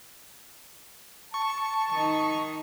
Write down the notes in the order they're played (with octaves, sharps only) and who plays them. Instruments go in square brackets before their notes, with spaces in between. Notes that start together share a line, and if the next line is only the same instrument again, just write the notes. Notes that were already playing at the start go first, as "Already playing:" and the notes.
[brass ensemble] A5 [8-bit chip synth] C#6
[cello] D#3 D#4